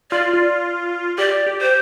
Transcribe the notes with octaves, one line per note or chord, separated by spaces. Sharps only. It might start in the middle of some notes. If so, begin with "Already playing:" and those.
F4 D5
F4
G4 D5
G4
C5